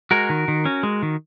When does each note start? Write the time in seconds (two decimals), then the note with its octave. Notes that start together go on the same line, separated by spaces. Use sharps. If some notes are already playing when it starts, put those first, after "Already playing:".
0.11 G#3 F#4 A#4
0.30 D#3
0.48 D#3
0.65 C#4
0.83 G#3
1.03 D#3